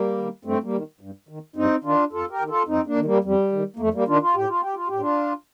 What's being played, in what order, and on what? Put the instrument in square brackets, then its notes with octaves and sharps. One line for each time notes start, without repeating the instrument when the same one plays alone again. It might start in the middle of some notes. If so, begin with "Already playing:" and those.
Already playing: [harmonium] G3 A#3
D#3
G2 A3 C4
G3 A#3
D#3
G2
D#3
G2 C4 D#4
D#3 D4 F4
F2 F4 A4
G4 A#4
D#3
F4 A4
F2 C4 D#4
A#3 D4
D#3
G3 A#3
F2 G3
D#3
A#3
F2 A3
G3 A#3
D#3 D4 F4
F4
A2 G4
F4
G4
F4
A2 G4
D4 F4